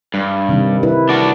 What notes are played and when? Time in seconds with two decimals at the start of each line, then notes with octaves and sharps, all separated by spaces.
0.14 G2
0.49 C3 D#3 G3
0.83 E4 B4
1.09 D4 F#4